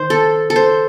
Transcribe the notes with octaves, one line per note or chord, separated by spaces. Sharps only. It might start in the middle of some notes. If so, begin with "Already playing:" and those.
Already playing: D#3 C5
A4
A4
C5